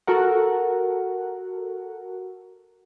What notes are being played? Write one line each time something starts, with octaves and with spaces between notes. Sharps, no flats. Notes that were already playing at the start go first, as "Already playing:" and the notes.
F#4 A4 A#4 F#5